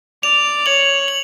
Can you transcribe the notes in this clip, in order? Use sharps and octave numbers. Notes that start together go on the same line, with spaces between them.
D5 F7
C#5 F#7
F#7